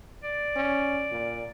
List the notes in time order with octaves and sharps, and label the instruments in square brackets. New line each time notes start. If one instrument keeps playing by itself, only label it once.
[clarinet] D5
[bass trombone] C#4
A#2